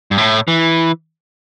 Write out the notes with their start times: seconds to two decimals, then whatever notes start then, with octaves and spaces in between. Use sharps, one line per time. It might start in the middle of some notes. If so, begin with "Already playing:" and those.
0.11 G2
0.18 A2
0.48 E3